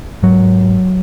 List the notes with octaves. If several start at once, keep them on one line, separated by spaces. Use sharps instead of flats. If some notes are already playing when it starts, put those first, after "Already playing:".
G#2 F#3